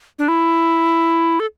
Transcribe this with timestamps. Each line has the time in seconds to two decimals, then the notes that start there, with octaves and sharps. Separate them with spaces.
0.19 D4
0.28 E4
1.40 A4